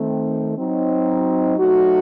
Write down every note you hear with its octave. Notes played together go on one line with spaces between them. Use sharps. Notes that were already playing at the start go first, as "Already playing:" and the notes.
Already playing: D#3 A3 C4
F#3 C4 D#4
F#3 A3 D#4 F#4